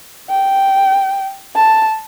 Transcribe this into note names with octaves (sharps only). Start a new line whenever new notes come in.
G5
A5